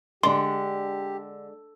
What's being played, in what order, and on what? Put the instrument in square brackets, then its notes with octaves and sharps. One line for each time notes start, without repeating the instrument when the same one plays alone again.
[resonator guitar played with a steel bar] D3 [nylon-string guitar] G#3 D4 [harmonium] G4 [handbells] C6